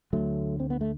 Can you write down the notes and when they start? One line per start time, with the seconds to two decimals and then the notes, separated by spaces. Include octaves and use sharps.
0.13 D2 D3 F#3 A3
0.60 C4
0.70 B3
0.81 A3